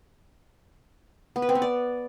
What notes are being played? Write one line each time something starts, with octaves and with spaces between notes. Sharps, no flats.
B3
B4
C4
B3
D5